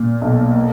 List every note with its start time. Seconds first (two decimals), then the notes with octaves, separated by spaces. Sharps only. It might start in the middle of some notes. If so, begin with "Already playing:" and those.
Already playing: A#2
0.21 B1
0.55 A#3